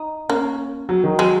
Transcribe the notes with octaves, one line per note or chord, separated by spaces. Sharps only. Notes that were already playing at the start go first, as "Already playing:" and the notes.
Already playing: D#4
A#3 C#4
F#3
D#3
F#3 G#3